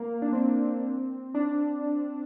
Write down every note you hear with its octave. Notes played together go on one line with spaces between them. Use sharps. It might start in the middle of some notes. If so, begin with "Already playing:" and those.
Already playing: A#3
D4
C4
D4